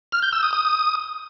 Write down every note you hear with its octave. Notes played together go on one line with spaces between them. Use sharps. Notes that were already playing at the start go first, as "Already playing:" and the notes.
F6
G6
E6
D#6
D#6